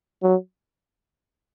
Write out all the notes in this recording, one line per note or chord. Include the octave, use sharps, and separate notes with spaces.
F#3